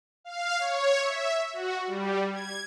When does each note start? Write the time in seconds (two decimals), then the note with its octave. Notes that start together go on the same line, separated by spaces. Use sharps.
0.24 F5
0.59 C#5
1.01 E5
1.53 F#4
1.87 G3
2.32 G#6